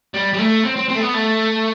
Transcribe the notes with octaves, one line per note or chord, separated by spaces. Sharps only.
G3
G3
A3
C4
C4
C4
A3
B3
A3